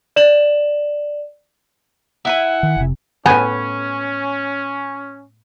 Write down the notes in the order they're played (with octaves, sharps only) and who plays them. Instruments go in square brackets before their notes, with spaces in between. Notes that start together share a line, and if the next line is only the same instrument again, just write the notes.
[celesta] D5 E7 F#7
[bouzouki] E4 E5 G#5 [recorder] F#5
[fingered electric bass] D#3
F1 C3
[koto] A2 B3 [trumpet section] C#4 [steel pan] G#5